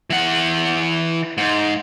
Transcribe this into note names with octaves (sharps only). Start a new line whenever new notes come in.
E3 F#5
G#2